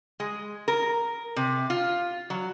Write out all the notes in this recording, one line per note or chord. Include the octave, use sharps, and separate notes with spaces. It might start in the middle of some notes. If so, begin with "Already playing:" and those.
G#3
A#4
C3
F4
F#3